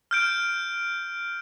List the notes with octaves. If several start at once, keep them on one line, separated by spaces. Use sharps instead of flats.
F6 G6 D7